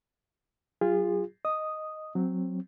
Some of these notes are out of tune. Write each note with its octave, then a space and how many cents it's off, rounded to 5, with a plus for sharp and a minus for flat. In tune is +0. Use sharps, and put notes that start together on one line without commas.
F#3 +20 F4 +0 G#4 -35
D#5 +0 D#6 +0
F#3 -10 C4 +0